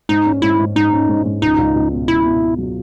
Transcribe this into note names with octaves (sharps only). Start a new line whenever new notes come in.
G#2 D#4
C#4
G#2 E4
G#2
G#2 D#4
C#4
G#2
G#2
C#2 D#4
C#2
C#2
B2
C#2 E4
B2
B2
F#3